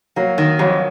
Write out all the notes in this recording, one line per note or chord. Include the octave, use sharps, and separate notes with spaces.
F#3 A#3
D#3
F2 F#3